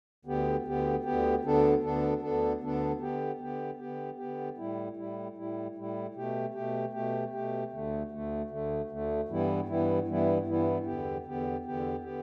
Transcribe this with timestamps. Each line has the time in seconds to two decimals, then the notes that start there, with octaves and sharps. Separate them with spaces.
0.25 D2 D3 B3 G4
0.65 D2 D3 B3 G4
1.04 D2 D3 B3 G4
1.43 D2 D3 B3 D4 A4
1.82 D2 D3 B3 D4 A4
2.22 D2 D3 B3 D4 A4
2.61 D2 D3 B3 D4 A4
3.00 D3 B3 G4
3.40 D3 B3 G4
3.79 D3 B3 G4
4.18 D3 B3 G4
4.57 A2 G3 E4
4.97 A2 G3 E4
5.36 A2 G3 E4
5.75 A2 G3 E4
6.14 B2 A3 G4
6.54 B2 A3 G4
6.93 B2 A3 G4
7.33 B2 A3 G4
7.71 D2 D3 A3
8.11 D2 D3 A3
8.50 D2 D3 A3
8.89 D2 D3 A3
9.28 G2 E3 G3 B3 E4
9.68 G2 E3 G3 B3 E4
10.07 G2 E3 G3 B3 E4
10.47 G2 E3 G3 B3 E4
10.86 E2 D3 B3 G4
11.25 E2 D3 B3 G4
11.64 E2 D3 B3 G4
12.03 D3 B3 G4